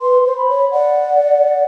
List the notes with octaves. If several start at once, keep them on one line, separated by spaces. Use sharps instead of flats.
B4 C6
C5 C6
B5
C#5
D5 F#5